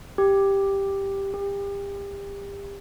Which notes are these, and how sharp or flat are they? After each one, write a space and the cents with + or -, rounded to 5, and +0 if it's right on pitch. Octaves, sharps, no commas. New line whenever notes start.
G4 +5
G4 +30